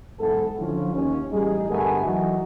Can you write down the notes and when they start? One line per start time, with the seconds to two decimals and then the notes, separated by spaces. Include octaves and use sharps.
0.19 B1 G#2 E3 B3 A4
0.59 D3 F3 F#3 C#4 E4 F4
0.92 D#2 C#4
1.32 A1 G3 D#4 G#4
1.70 D2 G2 A3 B3 A#4 G#5
2.05 E3 F#3 D#4 F#4